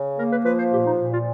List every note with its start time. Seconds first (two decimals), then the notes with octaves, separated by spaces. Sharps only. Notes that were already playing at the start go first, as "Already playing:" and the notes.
Already playing: C#3
0.17 A#3 A#4
0.31 B4
0.44 F3 B4
0.59 C5
0.72 A#2 G4
0.86 D#4
0.99 A#2
1.12 F4